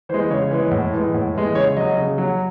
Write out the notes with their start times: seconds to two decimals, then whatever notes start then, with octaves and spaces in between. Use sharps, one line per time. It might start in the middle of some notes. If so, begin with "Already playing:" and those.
0.09 E3 C5
0.14 G#3
0.30 C#3 C#5
0.51 E3 G#3
0.71 A2
0.93 E3 G#3
1.14 A2
1.34 E3 G#3
1.55 C#3 C#5
1.76 F#3 D#5
1.97 C#3
2.18 F#3